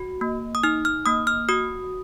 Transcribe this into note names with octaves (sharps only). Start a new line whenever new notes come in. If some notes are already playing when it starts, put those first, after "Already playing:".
Already playing: F#4
A#3
D#6
D#4 F6
F6
A#3 D#6
F6
F#4 D#6